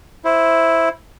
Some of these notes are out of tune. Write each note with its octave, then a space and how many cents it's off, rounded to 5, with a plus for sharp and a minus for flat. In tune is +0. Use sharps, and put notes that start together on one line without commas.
E4 +0 C5 +0